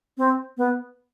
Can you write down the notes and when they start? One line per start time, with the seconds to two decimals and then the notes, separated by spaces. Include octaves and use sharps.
0.18 C4
0.57 B3